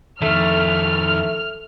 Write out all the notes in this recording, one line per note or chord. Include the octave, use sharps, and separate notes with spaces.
F2 D#3 A3 F6